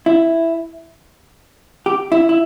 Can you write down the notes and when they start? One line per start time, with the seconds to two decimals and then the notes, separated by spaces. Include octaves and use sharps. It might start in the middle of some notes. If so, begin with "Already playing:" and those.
0.06 E4
1.86 G4
2.12 E4
2.29 E4